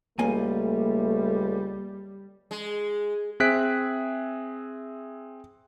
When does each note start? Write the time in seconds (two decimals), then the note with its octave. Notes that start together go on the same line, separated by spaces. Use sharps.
0.19 C#2 G3 A3 A#3 G#5
2.51 G#3
3.40 C4 G#4 E5 F#6 B6 D7